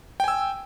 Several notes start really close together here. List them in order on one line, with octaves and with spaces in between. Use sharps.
G5 G#5 E6